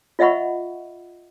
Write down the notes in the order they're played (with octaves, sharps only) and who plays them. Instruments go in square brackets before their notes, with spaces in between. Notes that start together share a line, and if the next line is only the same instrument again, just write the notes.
[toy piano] F4 D#5 E5 F#5 B5 C#6